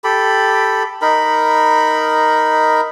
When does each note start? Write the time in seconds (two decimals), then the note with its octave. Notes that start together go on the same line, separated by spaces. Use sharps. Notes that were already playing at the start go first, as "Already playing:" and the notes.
0.04 G4 A4 B5
1.02 D#4 A#4 B5